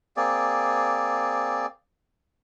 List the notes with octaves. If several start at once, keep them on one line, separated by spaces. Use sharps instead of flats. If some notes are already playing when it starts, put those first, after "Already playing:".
A#3 C4 G#4 D5